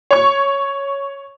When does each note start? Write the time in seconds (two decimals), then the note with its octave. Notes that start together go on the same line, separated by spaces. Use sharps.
0.11 C#5 C#6